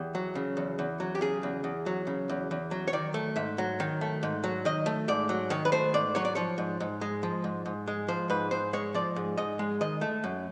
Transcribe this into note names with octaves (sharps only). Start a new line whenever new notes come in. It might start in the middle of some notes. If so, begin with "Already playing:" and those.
Already playing: E2 G4
F#3
C#3
E2
E2
F#3
G4
C#3 G#4
E2
E2
F#3
C#3
E2
E2
F#3
C#5
D#3 D5
A3
G#2 E5
F#3
D#3
A3
G#2
F#3
D#3 D#5
A3
G#2 D5
F#3
D#3 C#5
B4
A3 C5
G#2 D5
F#3 C#5
D5
F3 C#5
G#2
G#2
G#3
F3
G#2
G#2
G#3
F3 C5
G#2 B4
G#2 C5
G#3 C#5
F3 D5
G#2
G#2 D#5
G#3
D#3 D#5
A3
F#2